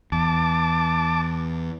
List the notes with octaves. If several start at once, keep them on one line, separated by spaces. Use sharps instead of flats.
E2 A5 D6